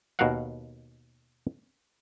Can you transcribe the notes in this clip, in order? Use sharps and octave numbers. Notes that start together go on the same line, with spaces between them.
D#2 B2 F#4 A#4 F5 F#5